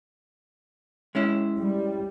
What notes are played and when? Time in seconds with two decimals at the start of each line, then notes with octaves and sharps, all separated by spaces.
1.15 G#3 C#4 E4
1.59 G3